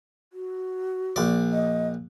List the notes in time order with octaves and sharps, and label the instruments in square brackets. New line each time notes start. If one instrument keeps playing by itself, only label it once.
[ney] F#4
[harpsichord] A#1 D5
[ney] D#5